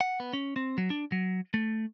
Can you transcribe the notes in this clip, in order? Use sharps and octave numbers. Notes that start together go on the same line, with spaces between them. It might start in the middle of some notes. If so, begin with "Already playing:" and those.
F#5
B3
C#4
C4
F#3
D4
F#3
A3